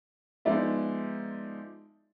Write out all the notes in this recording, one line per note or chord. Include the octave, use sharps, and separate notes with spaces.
F3 G#3 B3 D#4 D5 E5